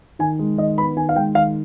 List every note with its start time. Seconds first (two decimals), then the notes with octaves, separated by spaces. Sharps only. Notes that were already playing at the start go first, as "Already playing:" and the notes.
0.19 D#3 G#5
0.39 G#3
0.58 D#3 D#5
0.78 B3 B5
0.96 D#3 G#5
1.09 F5
1.15 G#3 G5
1.34 D#3 F5